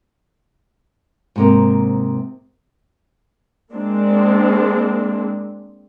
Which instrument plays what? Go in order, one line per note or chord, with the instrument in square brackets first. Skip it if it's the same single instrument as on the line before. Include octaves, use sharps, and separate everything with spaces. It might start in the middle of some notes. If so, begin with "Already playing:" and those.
[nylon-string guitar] G#2 C3 A#3
[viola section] G#3 A#3 C4 D4